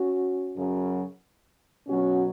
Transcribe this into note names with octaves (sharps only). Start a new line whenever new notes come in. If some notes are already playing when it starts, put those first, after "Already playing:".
Already playing: C#4 F#4
F#2 C#3 F#3
B2 F#3 C#4 F#4